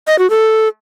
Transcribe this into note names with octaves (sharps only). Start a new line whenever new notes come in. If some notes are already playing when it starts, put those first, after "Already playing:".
D#5
F#4
A4